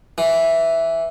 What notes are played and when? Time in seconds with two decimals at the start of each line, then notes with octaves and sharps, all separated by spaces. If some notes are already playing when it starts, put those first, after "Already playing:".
0.18 E3